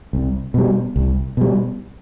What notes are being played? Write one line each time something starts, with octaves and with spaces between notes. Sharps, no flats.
C2
B2 G3
C2
B2 G3